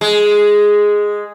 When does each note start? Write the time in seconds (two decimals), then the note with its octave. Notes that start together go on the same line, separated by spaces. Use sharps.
0.01 G#3